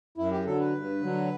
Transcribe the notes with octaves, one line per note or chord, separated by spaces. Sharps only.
F#2 E4
G4
D3 F#3 A4
B4
G2
D3 F#3